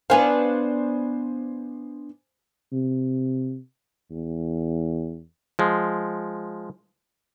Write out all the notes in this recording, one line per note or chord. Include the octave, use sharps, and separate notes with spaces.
B3 D4 C5 F5 G#5
C3
E2
F3 G#3